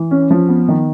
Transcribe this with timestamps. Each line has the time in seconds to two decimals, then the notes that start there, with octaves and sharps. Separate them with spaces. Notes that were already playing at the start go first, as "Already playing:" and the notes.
Already playing: E3
0.11 C#4
0.31 F3
0.49 B3
0.69 D#3